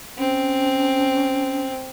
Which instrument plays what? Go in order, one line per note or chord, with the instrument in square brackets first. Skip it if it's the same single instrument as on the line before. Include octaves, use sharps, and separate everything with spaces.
[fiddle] C4 [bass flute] C#4